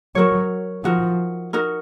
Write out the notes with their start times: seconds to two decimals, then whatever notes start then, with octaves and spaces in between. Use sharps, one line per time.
0.15 F#3 F#4 A#4 C#5
0.84 F3 D#4 F#4 A#4
1.53 D#4 F#4 A#4